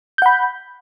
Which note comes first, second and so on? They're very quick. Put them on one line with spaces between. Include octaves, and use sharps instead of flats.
G6 F#5 B5